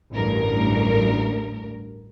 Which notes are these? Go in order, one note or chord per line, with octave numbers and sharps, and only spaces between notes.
A1 D2 G2 A#4